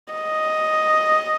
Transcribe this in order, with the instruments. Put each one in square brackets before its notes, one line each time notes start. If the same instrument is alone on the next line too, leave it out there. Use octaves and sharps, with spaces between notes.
[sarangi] D#5